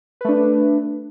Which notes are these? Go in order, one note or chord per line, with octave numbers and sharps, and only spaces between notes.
A3 D4 B4